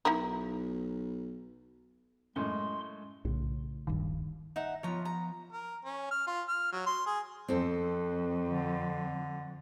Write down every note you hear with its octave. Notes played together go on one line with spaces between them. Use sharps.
B1 D#4 E4 A#4
F#2 A2 G#3 C6
B1 A2 C#3
D1 A#1 G2 D#3
D#4 E5 F#5
F3 B3 F4 C#5 A#5
A#5
A#4
C#4
F6
F4
F6
F#3
C6
G#4
F2 C4 A4
D3